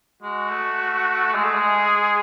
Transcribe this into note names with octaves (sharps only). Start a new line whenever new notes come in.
G#3 F#4
A3
G#3 G#4
A3
G#3